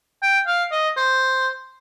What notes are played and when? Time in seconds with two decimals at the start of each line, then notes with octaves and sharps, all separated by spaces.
0.22 G5
0.47 F5
0.72 D#5
0.97 C5